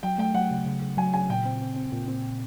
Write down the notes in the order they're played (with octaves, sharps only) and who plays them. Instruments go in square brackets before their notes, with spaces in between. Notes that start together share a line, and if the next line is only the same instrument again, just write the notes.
[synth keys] F#3 [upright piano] G5
[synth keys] A3 [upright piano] G5
[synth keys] F#3 [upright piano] F#5
[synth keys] C#3
C#3
C#3
[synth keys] F#3 [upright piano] G#5
[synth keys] C#3 [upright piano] G#5
[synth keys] A#2 [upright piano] G5
[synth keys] C4
C4
C4
A#2
C4